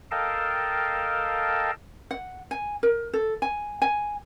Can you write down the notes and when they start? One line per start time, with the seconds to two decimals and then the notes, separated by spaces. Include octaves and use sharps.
0.11 A4 A#4 D#5 F5 G5 A5
2.11 F#5
2.51 G#5
2.83 A#4
3.13 A4
3.42 G#5
3.82 G#5